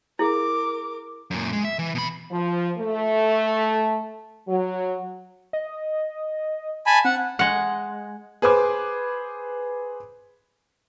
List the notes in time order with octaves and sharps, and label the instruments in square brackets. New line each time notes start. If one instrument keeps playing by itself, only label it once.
[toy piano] E4 G#4 F5 [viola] A#4 D6
[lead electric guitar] F#2 A#2
G#3
E5
E3
B2 B5
[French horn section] F3
A3
F#3
[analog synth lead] D#5
[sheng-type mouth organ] G#5 A5 B5
[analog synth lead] C4 [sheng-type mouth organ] F#5
[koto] G#3 F#5
[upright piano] G#4 B4 C5 D6 G#6